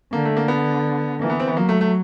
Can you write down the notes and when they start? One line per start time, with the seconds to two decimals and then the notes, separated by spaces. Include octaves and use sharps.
0.13 D3 A#3
0.25 A3
0.37 A#3
0.48 B3
1.21 E3 A#3
1.30 B3
1.40 C4
1.48 B3
1.57 F#3 A#3
1.69 A3
1.81 A3